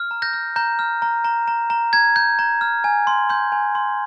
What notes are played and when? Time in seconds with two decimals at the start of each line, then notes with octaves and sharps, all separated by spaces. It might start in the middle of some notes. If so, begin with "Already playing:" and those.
Already playing: F6
0.11 A#5
0.22 G6 A#6
0.33 F6
0.56 A#5 G6
0.79 F6
1.02 A#5
1.24 A#5
1.48 A#5
1.70 A#5
1.93 A#5 G#6
2.16 G6
2.39 A#5
2.61 F6
2.84 G#5
3.07 C6
3.29 C6 G6
3.52 G#5
3.75 C6